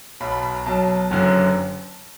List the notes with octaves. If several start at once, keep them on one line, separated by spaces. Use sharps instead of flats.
B1 B2 F#3 B5
B5
B5
A#5
B1 B2 F#3 A5
F#1 F#2 D3 F#3